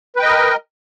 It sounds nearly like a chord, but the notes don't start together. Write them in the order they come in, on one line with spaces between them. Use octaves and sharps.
B4 G5 D#5 A#4